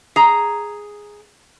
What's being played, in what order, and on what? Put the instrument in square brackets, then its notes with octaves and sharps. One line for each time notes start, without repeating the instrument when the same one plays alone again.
[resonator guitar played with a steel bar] G#4 A#5